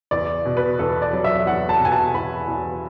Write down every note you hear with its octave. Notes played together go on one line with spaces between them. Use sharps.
E2 D5
B2
B4
E2 A4
D5
F#3
E5
E2 F#5
A5
B2 G#5
A5
E2 B5
E2